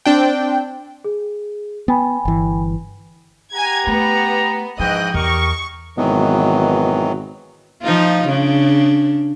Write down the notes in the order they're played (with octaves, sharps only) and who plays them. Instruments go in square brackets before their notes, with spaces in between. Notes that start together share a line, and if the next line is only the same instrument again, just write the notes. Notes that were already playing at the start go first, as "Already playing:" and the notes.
[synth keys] C4 D4 G5
[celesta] G#4
[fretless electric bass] B3 [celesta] G5 G#5 B5
[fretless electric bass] G1 E3
[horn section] G4 F#5 A#5 [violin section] G#5 G#6
[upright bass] A3 [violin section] B3
[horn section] G#2 E3 G5 [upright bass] F3 [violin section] D#5 F#6
[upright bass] E2 [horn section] G4 A#4 D#5 [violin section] C#6
[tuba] G#1 [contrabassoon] B2 [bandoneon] D#3 E3 F#3
[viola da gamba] F3 D#4 F4
C#3 D4